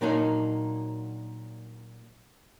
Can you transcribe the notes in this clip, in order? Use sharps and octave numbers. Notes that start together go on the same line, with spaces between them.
A#2 F#3 A#3 D4 D#4